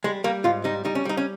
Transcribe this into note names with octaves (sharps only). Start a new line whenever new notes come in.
G3 G#3
G3 A#3
G#2 F4
G3 D#4
G3 D#4
C#4
G3 D#4
C#4